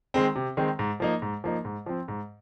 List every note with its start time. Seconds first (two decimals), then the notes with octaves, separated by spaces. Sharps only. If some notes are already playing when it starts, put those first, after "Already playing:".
0.14 D#3 G#3 C4
0.36 C3
0.57 D#3 G#3 C4
0.79 G#2
1.00 F3 A#3 D#4
1.22 G#2
1.44 F3 A#3 D#4
1.65 G#2
1.86 F3 C4
2.08 G#2